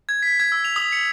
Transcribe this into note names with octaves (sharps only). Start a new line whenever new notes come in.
G#6
B6
G#6
E6
F7
D#6
C#7